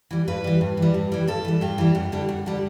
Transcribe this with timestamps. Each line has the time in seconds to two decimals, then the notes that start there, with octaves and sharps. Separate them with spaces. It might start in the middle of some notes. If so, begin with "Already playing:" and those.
0.11 E3 G3
0.28 G2 B4
0.44 E3 G3
0.61 G2
0.77 E3 G3
0.94 G2
1.12 E3 G3
1.27 G2 A4
1.45 E3 G3
1.61 G2 G4
1.78 E3 G3
1.95 F#2
2.12 D3 G3
2.29 F#2
2.46 D3 G3